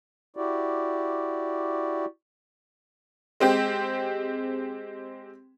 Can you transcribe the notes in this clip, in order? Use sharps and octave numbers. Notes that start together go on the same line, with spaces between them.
E4 F#4 G4 D5
G#3 C4 G4